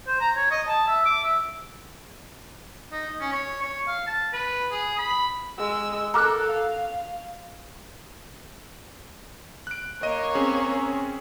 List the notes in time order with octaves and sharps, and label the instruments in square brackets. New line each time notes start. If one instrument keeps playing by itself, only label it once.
[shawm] C5
A#5
C#5
D#5
A5
E5
D6
E5
D#4
C#4
C#5
C#5
F5
A5
B4
G#4
B5
[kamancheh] G#3 E6
[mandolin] F#4 F#6 [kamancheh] A4 A#4 [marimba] A#5 D6 F6
[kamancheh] F5
[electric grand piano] F#6 D7
[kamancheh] A#3 C#5 [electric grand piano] D#5 D#7
[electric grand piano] C4 C#4 G#4